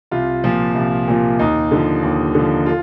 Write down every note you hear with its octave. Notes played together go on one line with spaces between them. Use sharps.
C2 F4
A#2 F3
C2
A#2 F3
D#2 D#4
D3 F3
D#2
D3 F3
F4